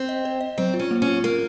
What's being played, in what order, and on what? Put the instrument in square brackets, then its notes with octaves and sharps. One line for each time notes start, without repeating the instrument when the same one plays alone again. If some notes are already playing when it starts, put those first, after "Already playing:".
Already playing: [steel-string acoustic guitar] C4
[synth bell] D#5
C5
D#5
[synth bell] F#3 [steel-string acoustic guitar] C4
[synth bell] F4
[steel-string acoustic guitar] C#4
[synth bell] A#3
[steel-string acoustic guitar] C#4
[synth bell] F4
[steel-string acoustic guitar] A#3 [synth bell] A#4